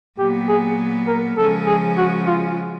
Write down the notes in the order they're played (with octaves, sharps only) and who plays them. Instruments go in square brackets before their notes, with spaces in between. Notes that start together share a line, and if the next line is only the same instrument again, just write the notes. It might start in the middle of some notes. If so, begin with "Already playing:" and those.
[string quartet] A#2 F#3 B3 [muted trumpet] G4
[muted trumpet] G#4
A#4
[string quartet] C#3 F3 G#3 C#4 [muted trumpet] A4
[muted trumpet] G#4
F#4
F4